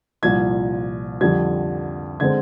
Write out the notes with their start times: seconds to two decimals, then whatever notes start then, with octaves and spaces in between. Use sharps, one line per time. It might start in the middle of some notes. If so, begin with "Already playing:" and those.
0.22 C2 A#2 F3 G#6
1.21 F2 D3 G3 G#6
2.20 D3 G#3 C4 G#6